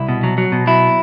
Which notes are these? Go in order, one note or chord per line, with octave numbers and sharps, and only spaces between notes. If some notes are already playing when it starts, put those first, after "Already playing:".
Already playing: C2 E4
B2
F#3
F#3
B2
F#3 E4